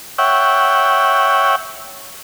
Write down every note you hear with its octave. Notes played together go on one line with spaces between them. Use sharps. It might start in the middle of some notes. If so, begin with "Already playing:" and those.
C#5 E5 F#5 G5